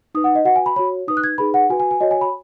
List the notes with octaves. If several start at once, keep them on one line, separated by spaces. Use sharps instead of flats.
D#4 B4 D#6
F#5
D#5
F#4 B4 F#5
G#5
B5
F#4 C#5 B5
D#4 B4 D#6
F#6
G#6
D#4 G#4 B4 B5
F#5
F#4 B4 G#5
G#5
G#5
F#4 C#5 D#5
G#5
B5